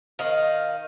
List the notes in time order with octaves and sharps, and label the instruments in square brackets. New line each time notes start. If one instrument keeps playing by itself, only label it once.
[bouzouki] D#3 D#5 F5